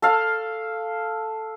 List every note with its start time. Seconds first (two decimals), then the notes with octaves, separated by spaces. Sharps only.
0.02 A4 F5